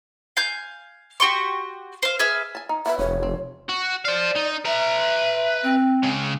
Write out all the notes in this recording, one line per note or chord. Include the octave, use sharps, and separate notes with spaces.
F5 G#5 G6
F#4 G4 C6 C#6
C5 F5
G#4 B4 E5 F6
G#5 A5
D#4
B3 F#4 B4 E5
F1 C#5
C4
F#4
C5 D5 F5
D#4
B4 E5 A#5
C4
C#3 G#3